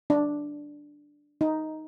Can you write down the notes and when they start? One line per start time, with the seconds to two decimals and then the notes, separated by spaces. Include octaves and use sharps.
0.10 D4
1.41 D#4